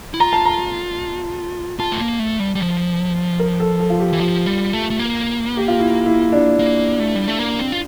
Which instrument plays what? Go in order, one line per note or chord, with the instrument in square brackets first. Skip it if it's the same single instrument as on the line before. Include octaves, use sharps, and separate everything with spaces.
[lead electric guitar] E4
[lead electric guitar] F4 [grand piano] A#5
[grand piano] A5
A#5
[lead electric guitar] F4 [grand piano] A5
[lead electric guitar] A3
A#3
A3
G3
G3
F3
[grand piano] A#4
A4
A4
F4
G4
[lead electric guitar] E3
[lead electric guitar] F3 [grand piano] F4
[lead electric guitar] G3
A3
A3
A#3
[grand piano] G4
F4
E4
E4
D4
[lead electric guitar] A#3
A3
G3
A3
A#3
C4
F4